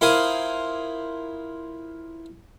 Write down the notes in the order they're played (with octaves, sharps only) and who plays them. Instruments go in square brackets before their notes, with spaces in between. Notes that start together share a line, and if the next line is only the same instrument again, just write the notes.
[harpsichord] E4 F4 A#4 C5 G#5 D#6